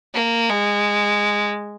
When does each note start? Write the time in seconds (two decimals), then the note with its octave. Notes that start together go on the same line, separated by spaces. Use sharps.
0.14 A#3
0.50 G#3